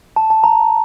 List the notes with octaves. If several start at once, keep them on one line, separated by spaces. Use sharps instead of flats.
A5
A5
A#5